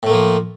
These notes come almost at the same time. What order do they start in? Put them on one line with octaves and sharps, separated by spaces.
A2 A3 A#3 F3